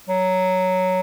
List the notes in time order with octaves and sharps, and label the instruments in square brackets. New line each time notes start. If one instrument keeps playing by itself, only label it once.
[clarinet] F#3